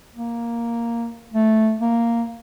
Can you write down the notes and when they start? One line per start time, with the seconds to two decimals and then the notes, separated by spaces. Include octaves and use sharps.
0.16 A#3
1.34 A3
1.81 A#3